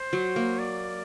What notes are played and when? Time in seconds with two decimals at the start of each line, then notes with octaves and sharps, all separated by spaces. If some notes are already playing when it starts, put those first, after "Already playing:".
Already playing: C5
0.13 F#3
0.36 A#3
0.59 D5